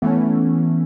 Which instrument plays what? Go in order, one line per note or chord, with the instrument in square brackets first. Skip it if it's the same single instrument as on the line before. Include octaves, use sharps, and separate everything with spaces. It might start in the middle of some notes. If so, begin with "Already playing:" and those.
[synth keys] E3 A3 C#4 [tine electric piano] B3